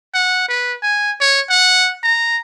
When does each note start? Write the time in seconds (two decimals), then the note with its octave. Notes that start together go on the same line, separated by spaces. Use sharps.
0.14 F#5
0.48 B4
0.82 G#5
1.20 C#5
1.50 F#5
2.03 A#5